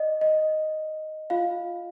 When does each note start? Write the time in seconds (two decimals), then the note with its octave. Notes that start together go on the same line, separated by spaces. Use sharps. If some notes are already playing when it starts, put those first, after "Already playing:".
Already playing: D5 D#5
0.21 D#5
1.30 F4 F5